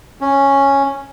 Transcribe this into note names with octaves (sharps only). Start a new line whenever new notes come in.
C#4